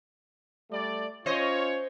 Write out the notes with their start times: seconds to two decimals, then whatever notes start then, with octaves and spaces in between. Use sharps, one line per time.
0.71 G3 A3 D5
1.26 C#4 F4 C5 C#5 D#5